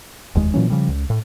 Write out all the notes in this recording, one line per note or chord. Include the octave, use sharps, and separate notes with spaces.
F1 D#2 G#3
A#2 E3 F#3 C#4
C#3 F3 G3
C#2
A2